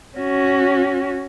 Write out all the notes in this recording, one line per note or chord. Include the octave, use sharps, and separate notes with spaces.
C#4 F#4